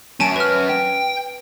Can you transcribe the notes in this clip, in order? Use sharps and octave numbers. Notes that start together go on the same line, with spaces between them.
F#3 C#4 G#5 A5 D7
B4 F6
G5